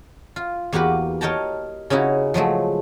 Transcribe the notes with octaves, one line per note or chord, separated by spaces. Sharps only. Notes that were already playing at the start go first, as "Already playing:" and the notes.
F4
E2 A#3 F#4 G4 B4
A#4 C#5 D#5 G5 A5 A#5
C#3 C#4 D#4 E4 F#4
F3 F#3 G#3 A3